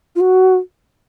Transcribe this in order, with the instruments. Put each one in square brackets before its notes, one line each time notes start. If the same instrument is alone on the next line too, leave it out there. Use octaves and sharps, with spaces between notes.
[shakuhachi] F4
F#4